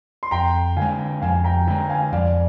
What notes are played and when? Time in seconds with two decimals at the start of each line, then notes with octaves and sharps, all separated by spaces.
0.23 C6
0.31 F2 G5 A#5
0.77 D3 G#3 F5 G#5
1.22 F2 F5 G#5
1.44 G5 A#5
1.67 D3 G#3 G5 A#5
1.89 F5 G#5
2.12 F2 D5 F5